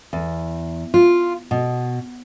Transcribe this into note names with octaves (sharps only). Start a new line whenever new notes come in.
E2
F4
B2